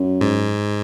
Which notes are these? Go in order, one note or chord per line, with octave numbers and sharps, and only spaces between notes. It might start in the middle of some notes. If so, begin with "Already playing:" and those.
Already playing: F#2
G#2